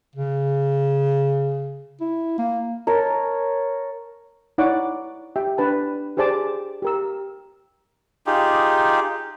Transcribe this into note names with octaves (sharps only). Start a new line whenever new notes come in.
C#3
E4
A#3
A#4 C#5 A5
D#4 E4 C#5 D5 F#5 D6
G4 E5 G5
D4 B4 A5
G4 G#4 C5 D5 A5 D6
G4 A#4 E6
D#4 F4 G4 G#4